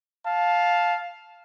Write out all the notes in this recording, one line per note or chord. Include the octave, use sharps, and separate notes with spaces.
F5 A5